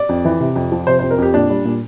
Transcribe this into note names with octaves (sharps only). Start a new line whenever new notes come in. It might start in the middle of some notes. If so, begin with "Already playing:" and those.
Already playing: D5
F2
E3
C3
F2
F3
C3 C5
F2 C5
A#4
F2 G4
A#2 D4
G3
A#2